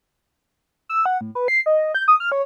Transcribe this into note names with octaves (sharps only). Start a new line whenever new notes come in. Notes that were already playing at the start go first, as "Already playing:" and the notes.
E6
F#5
A2
B4
C7
D#5
G6
D#6
F6
C#5